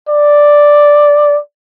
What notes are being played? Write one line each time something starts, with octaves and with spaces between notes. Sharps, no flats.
D5